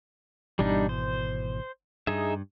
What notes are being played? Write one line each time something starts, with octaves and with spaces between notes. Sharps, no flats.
G#1 B2 E3 G3 D4 D#4
C5
G2 D#4 G#4 E5